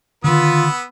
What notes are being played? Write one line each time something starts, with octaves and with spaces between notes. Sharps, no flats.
D3 D#3 B3 F4 B4 E6